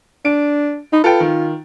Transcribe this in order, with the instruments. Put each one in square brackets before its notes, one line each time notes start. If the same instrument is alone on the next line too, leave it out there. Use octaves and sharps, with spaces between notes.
[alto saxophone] D4 [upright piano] D7
[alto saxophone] D#4 [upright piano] B5
[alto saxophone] F4 [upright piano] A4 B4 G5
[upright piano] D#3